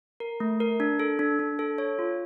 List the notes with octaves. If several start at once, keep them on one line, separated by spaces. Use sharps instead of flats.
A#4
A3
A#4
D4
A4
D4
D4
A4
C#5
F4